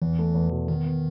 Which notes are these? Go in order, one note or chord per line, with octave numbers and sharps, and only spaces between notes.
E2 E3
A3
E2
B2
D#3 B3
B3